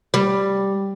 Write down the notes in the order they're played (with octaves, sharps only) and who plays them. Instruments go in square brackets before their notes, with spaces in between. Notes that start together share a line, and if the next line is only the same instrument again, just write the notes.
[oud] G3